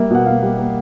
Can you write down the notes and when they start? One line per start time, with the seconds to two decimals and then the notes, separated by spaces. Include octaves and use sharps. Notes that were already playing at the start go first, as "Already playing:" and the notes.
Already playing: G3 A#3 E5
0.11 B2 F#5
0.26 B2 F5
0.42 G3
0.58 A#3